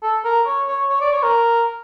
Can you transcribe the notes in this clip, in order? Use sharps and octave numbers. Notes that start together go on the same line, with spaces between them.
A4
A#4
C#5
C#5
C#5
D5
C#5
A#4